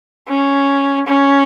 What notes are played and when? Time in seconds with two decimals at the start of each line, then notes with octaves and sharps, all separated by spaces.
0.28 C#4
1.06 C#4